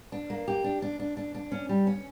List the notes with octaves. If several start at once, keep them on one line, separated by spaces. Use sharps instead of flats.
D4
A#3
G4
D4
D4
D4
D4
D4
C#4
G3
C#4